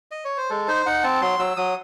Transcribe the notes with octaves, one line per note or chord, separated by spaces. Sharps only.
D#5
C#5
C5
G#3 A4
D#4 C5
D#4 F#5
C4 A5
F#3 C6
F#3 E6
F#3 D#6